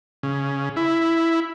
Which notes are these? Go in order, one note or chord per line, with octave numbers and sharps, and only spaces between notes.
C#3
E4